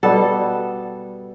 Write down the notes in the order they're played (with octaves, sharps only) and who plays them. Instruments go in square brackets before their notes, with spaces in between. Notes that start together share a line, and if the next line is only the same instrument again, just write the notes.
[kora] B2 G3 B3 A4